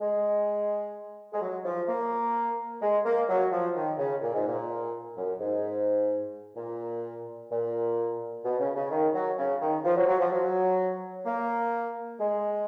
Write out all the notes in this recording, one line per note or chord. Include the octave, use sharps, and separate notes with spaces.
G#3
G#3
F#3
F3
A#3
G#3
A#3
F#3
F3
D#3
C#3
A#2
G#2
A#2
F#2
G#2
A#2
A#2
B2
C#3
C#3
D#3
F#3
C#3
D#3
F3
F#3
F#3
F3
F#3
A#3
G#3